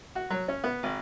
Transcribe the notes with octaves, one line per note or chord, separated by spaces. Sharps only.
F#4
F#3
C#4
B3
G#1